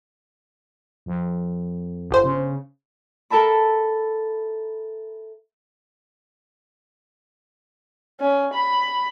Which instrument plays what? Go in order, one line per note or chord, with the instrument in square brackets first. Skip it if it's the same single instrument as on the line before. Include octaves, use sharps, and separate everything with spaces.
[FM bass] F2
[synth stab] G1 C5
[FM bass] C#3
[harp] A4 A#4 E5 A5 B5
[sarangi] C#4
B5